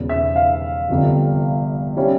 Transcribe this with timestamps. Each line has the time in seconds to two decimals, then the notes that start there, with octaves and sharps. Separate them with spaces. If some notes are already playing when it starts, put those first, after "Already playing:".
Already playing: E1 E2 C#3
0.09 E5
0.36 F5
0.89 G1 F2 C3 G3
1.96 G3 C#4 E4